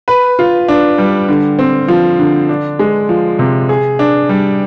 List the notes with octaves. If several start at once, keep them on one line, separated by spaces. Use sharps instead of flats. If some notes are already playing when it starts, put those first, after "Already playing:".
B4
F4
D4
G3
D3
C4
F3
D3
D4
G#3
F3
C3
G#4
D4
G3